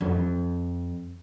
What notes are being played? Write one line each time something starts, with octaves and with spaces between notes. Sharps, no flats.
F2